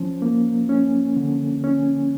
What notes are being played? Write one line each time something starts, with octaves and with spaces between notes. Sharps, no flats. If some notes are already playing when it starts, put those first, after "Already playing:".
Already playing: F3 C#4
A#3
C#4
D3
C#4